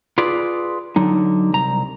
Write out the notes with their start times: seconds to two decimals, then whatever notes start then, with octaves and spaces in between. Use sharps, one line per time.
0.18 F4 G#4 B4 D5
0.96 D3 F#3 D#4
1.54 C2 A#5